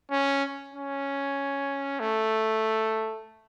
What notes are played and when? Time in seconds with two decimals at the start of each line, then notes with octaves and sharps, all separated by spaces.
0.11 C#4
0.74 C#4
2.00 A3